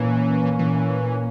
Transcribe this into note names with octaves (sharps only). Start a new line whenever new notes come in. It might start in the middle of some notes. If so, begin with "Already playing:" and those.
Already playing: A#2 E3 A#3 C#4
E3